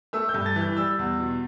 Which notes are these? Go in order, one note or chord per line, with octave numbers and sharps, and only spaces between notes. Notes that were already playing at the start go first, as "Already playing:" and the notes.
A3 E6
G6
G2
A6
E3
G6
G3 E6
E2
B2